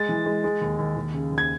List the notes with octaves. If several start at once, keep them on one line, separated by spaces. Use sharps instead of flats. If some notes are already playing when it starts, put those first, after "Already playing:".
Already playing: G#3 A6
E3
G#3
G#3
D#2
D#2
D#2
C#3
D#2
G#6